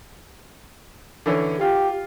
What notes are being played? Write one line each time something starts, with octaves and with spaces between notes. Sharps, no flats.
D3 E3 C#4
F4 G4